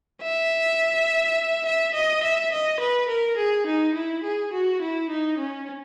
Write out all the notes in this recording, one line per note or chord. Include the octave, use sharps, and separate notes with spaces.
E5
E5
D#5
E5
D#5
B4
A#4
G#4
D#4
E4
G#4
F#4
E4
D#4
C#4